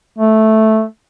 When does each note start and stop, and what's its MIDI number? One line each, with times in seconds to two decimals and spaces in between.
0.18 0.83 57